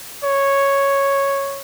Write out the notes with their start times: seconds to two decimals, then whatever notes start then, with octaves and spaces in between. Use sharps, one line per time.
0.24 C#5